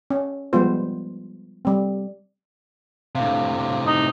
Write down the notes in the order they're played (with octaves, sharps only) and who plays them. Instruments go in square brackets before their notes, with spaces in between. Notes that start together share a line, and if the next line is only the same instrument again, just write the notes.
[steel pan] C#4
F3 G3 G#3 B3 F4 C5
G3 C4
[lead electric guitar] A2 C3 [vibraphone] D4 F5
[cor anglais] D#4